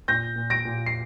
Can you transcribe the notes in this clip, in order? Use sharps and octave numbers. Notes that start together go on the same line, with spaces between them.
A#2 G6 A#6
A#2
A#6 D7
A#2
C7